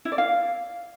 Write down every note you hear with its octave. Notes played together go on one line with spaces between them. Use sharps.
E4
D5
F5